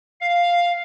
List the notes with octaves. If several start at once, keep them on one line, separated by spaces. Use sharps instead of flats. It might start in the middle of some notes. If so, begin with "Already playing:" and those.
F5